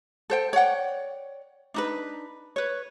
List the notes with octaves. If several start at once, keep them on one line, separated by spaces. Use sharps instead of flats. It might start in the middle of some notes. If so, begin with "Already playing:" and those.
A4 C5 G5
C#5 D5 F#5 G5
D4 D#4 B4
B4 C#5